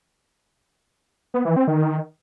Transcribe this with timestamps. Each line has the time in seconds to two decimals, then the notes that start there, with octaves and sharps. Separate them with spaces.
1.34 B3
1.45 E3
1.56 C4
1.68 D#3